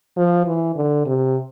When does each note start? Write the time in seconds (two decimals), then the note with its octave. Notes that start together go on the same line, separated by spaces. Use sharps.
0.17 F3
0.47 E3
0.76 D3
1.06 C3